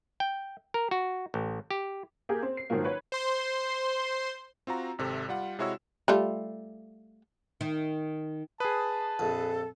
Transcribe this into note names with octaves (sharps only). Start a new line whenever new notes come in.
G5
A#4
F#4
A1
G4
A#3 G4 G#4 A#4
C4
C7
G#2 D#3 F3 F#3 A#3
B4 C#5
C5 C6
C4 F4 F#4 A#5
G#1 C3 A4
G3 F4 F#5
C3 G#3 E4 F#4 C#5 E6
G3 A3 F4
D#3
G#4 B4 A5 D#6
A#1 F2 A4